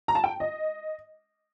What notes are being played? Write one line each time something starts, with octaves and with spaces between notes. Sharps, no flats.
A#5
A5
G5
D#5